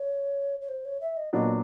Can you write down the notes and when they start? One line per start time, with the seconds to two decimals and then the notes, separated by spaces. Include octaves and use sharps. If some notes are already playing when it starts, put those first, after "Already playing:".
Already playing: C#5
0.61 C#5
0.69 C5
0.85 C#5
1.01 E5
1.17 D#5
1.33 A#2 F#3 B3 D4 D#5